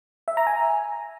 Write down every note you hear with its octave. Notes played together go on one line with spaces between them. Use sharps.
E5
A#5
G#5